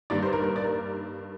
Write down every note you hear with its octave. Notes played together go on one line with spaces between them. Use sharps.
G2 D#3 A#3 D5
C5
A#4
A#4
D5
A#4